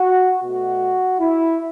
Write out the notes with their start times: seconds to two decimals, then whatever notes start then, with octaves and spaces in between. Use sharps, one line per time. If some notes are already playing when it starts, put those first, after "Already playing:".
Already playing: F#4
0.42 B2 A3 F#4
1.19 E4